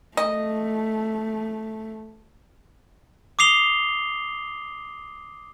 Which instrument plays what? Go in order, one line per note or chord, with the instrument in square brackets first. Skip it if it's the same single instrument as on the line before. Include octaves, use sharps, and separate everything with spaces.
[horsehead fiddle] A3 [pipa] D#5
[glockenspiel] D6 D#6 C7 F7 G7